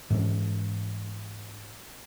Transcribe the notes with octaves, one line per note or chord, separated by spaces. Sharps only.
G#2 E3 G#3 C#4